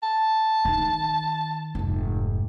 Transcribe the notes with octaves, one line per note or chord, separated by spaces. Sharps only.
A5
D#3 D#4
F1 G#2